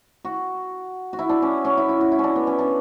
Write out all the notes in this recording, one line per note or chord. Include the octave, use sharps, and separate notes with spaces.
F#4
F#4
E4
D4
C#4
C#4
E4
E4
F#4
E4
C#4 D4
B3
C#4
D4